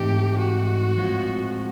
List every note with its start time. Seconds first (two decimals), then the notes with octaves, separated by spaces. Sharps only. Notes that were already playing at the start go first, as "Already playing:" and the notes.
Already playing: G#2 E3 A3 C4 D#4 G4
0.39 F#4
0.97 A2 F3 G#3 C4 F4